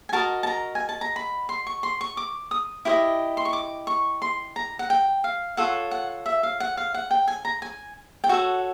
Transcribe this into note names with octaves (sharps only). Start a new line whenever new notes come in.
G#5
F#4 A#4 D#5 A5
A5
A#5
G#5
A5
A#5
B5
C6
C#6
C6
C#6
D6
D#6
E4 G4 C5 D#5
C6
C#6
D6
C#6
C6
A#5
F#5
G5
F5
F4 A4 C#5 F#5
F#5
E5
F5
F#5
F5
F#5
G5
G#5
A#5
G#5
G5
F#4 A4 C#5 F#5